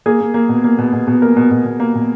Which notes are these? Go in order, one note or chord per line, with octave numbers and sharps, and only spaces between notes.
A#3 G#4
A#3
A#3
B2
A#3
B2
B2
B2
A#3 A#4
B2
B2
B2
A#3
B2